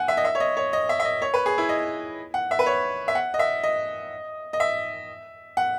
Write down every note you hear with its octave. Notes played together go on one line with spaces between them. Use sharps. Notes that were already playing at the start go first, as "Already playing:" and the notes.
Already playing: F#5 G#5
E5
D#5
E5
C#5
D#5
C#5
D#5
E5
E5
D#5
C#5
B4
G#4
E4
D#5
F#5
E5
B4
C#5
E5
F#5
D#5
E5
D#5
D#5
E5
F#5